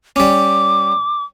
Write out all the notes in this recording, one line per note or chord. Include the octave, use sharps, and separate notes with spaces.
G3 C#4 D6